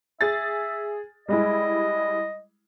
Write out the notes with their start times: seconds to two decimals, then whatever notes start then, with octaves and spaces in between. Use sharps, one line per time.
0.21 G#4 E5 A6
1.28 G3 G#3 E4 D#5